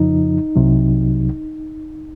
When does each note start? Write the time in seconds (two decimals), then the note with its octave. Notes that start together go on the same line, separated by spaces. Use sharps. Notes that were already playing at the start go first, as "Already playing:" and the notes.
Already playing: F2 C#3 F3 D#4
0.56 C2 C3 F#3